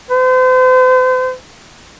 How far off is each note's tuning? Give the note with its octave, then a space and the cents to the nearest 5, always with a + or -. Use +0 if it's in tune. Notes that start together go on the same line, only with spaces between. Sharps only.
C5 -40